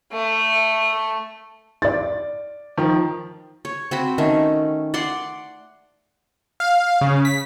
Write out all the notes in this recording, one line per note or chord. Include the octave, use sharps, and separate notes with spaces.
A3
D5 A6
D#3 F3
C#5
C4 F#4 B5
D#3 A3 C#4
D5 F#5 C6
F5
C#3
B6